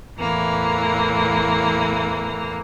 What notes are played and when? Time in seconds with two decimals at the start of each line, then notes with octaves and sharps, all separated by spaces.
0.19 E2 A2 E3 A#3